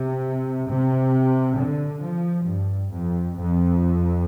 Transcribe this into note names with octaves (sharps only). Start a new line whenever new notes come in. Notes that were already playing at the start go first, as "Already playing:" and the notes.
Already playing: C3
C3
D3
F3
G2
F2
F2